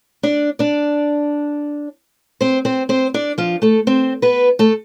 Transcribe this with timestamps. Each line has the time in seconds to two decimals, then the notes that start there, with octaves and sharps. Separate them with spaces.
0.23 D4 D5
0.59 D4 D5
2.41 C4 C5
2.65 C4 C5
2.89 C4 C5
3.14 D4 D5
3.38 F3 F4
3.62 A3 A4
3.87 C4 C5
4.22 B3 B4
4.59 A3 A4